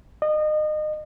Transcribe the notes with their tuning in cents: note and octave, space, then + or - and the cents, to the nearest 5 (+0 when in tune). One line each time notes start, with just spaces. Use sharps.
D#5 -30